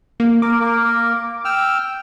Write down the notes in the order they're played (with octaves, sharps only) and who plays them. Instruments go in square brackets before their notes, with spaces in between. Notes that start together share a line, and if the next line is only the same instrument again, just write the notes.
[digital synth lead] A#3
[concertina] A#4 [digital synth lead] D6
[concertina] A#3 A#4
G5 E6 F6